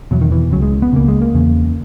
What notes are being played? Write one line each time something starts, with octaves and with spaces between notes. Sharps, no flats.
E2 B2 F#3
D#3
E3
C#2 C#3 F#3
G#3
B3
C#2 C#3 A#3
G#3
A#3
E2 C#3